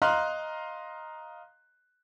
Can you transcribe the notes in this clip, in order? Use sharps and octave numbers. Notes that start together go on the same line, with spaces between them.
D#5 F5 A#5 C6 F6 F#6